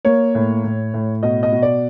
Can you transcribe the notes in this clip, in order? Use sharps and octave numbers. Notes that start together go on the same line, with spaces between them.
A#3 C#5
A2
A2
A2
B2 D#5
D#5
B2
D5